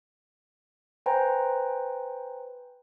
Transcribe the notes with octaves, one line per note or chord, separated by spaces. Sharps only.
B4 C5 G5 G#5 A#5